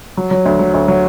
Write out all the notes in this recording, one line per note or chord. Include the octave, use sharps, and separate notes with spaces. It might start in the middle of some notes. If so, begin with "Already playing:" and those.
F#3
F#3
D2
F#3
D2
F#3